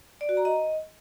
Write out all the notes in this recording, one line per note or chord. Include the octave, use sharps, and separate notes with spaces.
D5
F#4
A#5
D#5